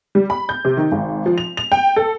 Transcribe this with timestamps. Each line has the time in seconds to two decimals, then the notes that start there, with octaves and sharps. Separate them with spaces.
0.15 G3
0.30 B5
0.49 G6
0.65 C3
0.77 D#3
0.92 G#1
1.26 F3
1.38 F7
1.57 F7
1.72 G5
1.96 A4